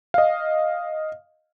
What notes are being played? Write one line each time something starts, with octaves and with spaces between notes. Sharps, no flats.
D#5 F5